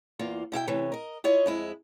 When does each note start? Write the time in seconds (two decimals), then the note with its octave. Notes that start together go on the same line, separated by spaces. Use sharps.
0.19 E2 A#3 F4
0.52 B2 E4 E5 G5
0.67 C3 E3 A3 C#4
0.92 A#4 D#5
1.24 E4 F4 C#5 D#5
1.46 F2 G#3 E4